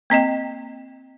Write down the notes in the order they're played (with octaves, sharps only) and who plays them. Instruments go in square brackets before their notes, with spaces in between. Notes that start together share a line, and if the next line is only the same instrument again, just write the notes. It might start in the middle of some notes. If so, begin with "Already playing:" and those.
[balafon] A#3 C4 D#5 G5